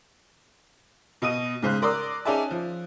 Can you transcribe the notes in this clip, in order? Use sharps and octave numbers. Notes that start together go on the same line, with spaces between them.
B2 D#5 D#6 D#7
G#2 C#3 C5 F#6
A#4 D5 C6 D#6 E6
C#4 D#4 G#4 D5 E5 A5
F3